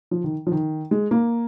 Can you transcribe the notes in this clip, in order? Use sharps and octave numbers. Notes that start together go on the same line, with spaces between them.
F3
D#3
F3
D#3
G#3
A#3